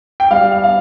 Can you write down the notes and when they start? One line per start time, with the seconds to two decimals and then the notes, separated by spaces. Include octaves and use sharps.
0.20 G5
0.31 G3 F5
0.52 F5
0.64 F5